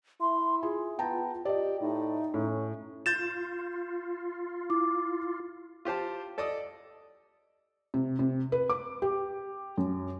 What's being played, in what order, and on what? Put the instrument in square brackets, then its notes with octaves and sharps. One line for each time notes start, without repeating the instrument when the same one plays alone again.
[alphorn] E4 [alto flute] C6
[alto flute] F4 [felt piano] G#4
[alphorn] B3 [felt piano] G5 A5 A#5
[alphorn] G4 [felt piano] D5 D#5
[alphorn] A2 [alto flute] D#4
[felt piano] A2 [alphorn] C#4
[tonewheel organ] F4 [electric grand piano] G6 A6 E7
[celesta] E4 D6
[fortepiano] F4 G4 C5 A5
A4 D5 D#5 D#6
[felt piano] C3
C3
B4
D6
G4
F#2